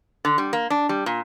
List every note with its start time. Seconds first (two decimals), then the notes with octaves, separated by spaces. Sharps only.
0.25 D3
0.38 G3
0.53 A#3
0.70 D4
0.89 G3
1.06 A#2